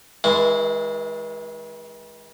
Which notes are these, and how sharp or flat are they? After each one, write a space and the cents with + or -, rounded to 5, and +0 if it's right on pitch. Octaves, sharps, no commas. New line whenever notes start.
E3 -45 G#3 +0 E4 +0